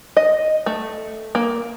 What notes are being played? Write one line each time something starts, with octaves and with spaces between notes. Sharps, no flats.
D#5
A3
A#3